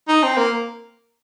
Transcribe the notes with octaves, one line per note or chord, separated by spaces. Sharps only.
D#4
C4
A#3